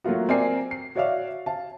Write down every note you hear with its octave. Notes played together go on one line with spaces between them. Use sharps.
F#3 A3 A#3 F4 F#4
C4 A#4 D5 G#5 C7
C7
F#4 C#5 D5 E5 F5
F5 A5